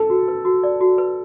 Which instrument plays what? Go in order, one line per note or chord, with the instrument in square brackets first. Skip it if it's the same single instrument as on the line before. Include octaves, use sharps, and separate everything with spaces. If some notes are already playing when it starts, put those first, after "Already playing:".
Already playing: [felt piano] A4
[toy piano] F#4
B4
F#4
D5
F#4
B4